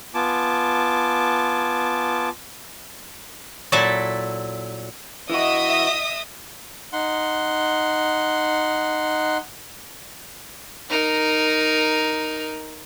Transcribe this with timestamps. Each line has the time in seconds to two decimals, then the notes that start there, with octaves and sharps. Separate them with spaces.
0.15 B3 F4 G#5 A5 D6
3.72 A#2 F#3 E4 A4 E5
5.30 E3 E4 F#4 D#5 E5 D#6
6.93 D#4 F#5 C6
10.90 D#4 A#4